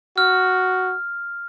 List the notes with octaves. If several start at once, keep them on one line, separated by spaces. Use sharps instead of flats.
F#4 F6